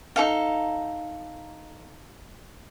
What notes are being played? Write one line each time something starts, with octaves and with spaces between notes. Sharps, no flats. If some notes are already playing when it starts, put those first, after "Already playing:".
D#4 A4 F5